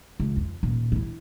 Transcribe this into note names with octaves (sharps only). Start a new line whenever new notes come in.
C#2
F2
D#1
D#4 E4